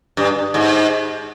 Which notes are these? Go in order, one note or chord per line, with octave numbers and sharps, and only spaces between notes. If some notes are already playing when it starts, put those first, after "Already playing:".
G2
G#2